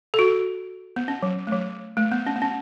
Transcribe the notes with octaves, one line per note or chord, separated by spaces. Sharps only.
A4
F#4
B3
C#4
F#3
A3
F#3
A3
B3
C#4
B3
C#4